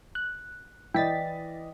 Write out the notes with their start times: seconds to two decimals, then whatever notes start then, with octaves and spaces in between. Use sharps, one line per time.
0.15 F#6
0.94 E3 E4 D5 D#5 G5 A6 B6